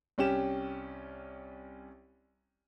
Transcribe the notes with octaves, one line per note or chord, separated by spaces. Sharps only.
C2 C#4 G4 E7